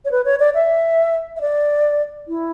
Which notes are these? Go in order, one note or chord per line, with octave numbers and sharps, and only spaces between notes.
C#5
B4
C#5
D5
E5
E5
D5
E4